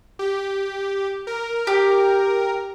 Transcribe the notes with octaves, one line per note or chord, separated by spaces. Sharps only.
G4
A#4
G4